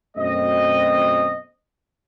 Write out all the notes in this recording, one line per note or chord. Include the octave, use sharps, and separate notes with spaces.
F#2 B2 A3 C4 D#5